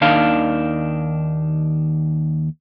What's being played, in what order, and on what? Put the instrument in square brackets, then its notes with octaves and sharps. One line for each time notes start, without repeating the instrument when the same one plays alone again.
[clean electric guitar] D#2 D#3 D4 F5